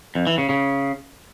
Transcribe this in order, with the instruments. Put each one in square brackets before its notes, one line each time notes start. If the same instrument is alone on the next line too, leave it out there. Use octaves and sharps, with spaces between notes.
[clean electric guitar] F2
E3
C#3
C#3